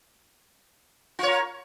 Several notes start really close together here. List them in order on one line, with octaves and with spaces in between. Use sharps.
F4 C#5 A#4